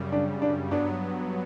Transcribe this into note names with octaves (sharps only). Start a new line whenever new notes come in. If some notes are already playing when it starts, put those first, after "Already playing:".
Already playing: F#2 C#3 G3
D4
D4
G2 F#3 B3 D4